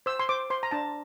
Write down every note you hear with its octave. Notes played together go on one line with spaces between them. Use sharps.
C5 E6
C6
C5 D6
C5 C6
A#5
D4 A5